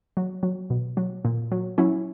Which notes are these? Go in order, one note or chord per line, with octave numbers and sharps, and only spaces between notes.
F#3
F#3
B2
F#3
A#2
F#3
F#3 C#4 E4